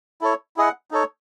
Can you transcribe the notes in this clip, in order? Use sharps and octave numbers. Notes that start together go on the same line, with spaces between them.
E4 A4 C#5
E4 G#4 D#5 F#5
D#4 A4 C#5